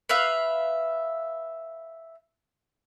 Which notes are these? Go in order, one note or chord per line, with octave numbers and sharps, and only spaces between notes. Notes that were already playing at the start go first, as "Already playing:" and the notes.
B4 E5 F5